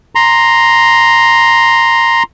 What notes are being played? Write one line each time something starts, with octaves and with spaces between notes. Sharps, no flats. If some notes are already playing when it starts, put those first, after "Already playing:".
A#5 C6